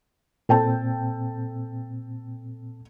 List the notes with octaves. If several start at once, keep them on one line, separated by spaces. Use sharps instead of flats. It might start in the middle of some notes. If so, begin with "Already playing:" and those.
A#2 C4 A4 G5 A5